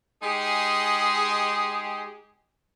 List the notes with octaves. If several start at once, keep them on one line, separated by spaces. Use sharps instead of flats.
G#3 D#4 G4 G#4